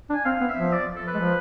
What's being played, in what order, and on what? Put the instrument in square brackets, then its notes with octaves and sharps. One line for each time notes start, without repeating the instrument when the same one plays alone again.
[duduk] D4
[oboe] G#5
[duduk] C4 [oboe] F5
[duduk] B3
[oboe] E5
[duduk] F3
[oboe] D5
A4
B4
[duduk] G#3
F3